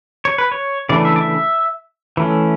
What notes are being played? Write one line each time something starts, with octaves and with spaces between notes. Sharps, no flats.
C#5
B4
C#5
C#3 E3 A3 D4 D5
E5
D5
E5
E3 A3 C#4